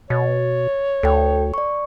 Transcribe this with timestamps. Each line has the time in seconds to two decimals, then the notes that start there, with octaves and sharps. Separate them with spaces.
0.10 B2 C#5 A6
1.03 D2 A4 G5
1.54 D5 C#6